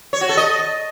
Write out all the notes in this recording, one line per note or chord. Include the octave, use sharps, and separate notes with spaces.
C#5
F#4
A4
D#5